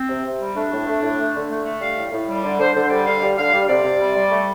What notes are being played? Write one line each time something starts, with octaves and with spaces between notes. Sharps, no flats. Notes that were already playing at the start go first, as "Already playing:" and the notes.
Already playing: C4
C3
C3
G3
A3 D4
A2
A3
A2
A3
D3
A3
A3
G3 F5
A2
A2
G3
D3 D5
D3 C5
D3 C5
G3 D5
D3 F5
G3
D3 F5
G3
C3 D5
C3
G3
G3
A3